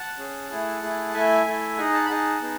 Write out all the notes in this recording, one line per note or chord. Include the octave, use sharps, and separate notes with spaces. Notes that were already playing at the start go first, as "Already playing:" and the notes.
Already playing: F#5 A5
C#4 G#4
A3 E4 G#4
A3 E4 G#4
A3 E4 A4 E5 G#5
A3 E4 A4
D#4 G#4 D#5 F#5
F#5 A5
B5
D#4 G#4 F#5 A5
B3 D#4 G#4